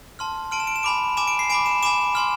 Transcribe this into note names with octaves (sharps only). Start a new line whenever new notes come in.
A5 C6 F6
A5 C6 F6 D7
E7
D7
E7
G#5 B5 D6 D7
G#5 B5 D6 E7
D7
C7
G#5 B5 D6 D7
E7
G#5 B5 D6 E7
G#5 C6 F6